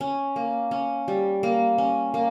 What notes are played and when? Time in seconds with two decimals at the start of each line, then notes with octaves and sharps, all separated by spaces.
0.01 C#4
0.36 A#3
0.71 C#4
1.08 G3
1.43 A#3
1.78 C#4
2.14 A#3